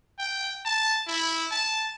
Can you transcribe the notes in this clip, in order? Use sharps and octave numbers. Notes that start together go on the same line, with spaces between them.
G5
A5
E4
A5